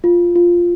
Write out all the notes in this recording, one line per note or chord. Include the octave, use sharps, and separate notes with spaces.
F4
F4